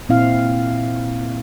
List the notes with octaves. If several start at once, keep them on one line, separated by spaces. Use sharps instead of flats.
A#2 C4 E4 F5